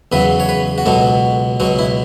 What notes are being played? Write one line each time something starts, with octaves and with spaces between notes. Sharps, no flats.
E2 C#3 F#3 B4
C#5
B4
F#4
C#2 B2 F#3 A4
C#2 B2 F#3 F#4
E4